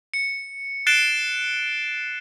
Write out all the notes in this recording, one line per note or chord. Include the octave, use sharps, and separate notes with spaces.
C#7
F#6 A6 C7 D7 E7 G7